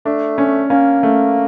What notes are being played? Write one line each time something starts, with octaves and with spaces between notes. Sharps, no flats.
A3 D4
C#4
A#3 C#4
A3